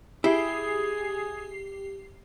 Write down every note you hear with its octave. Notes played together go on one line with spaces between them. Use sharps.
E4 G4 G#4 C7